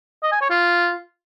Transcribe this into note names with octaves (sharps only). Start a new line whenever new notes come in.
D#5
G#5
C#5
F4